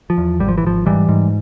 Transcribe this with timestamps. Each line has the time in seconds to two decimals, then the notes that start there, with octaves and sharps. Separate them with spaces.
0.10 F3
0.18 E2
0.40 G#1 G3
0.48 F3
0.58 E3
0.63 G#1 F3
0.86 G#2 E3 G3
1.09 G#2